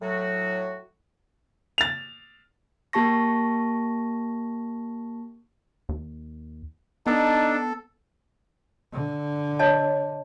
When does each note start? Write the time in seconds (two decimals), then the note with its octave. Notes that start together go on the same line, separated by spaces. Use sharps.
0.02 A2 F#3 F#4
1.78 A6 F7
2.93 A#3 G4 A5 C#6 A#6
5.89 D#2
7.07 B3 D4 D#4 A4
8.93 D3
9.59 C#5 D#5 A5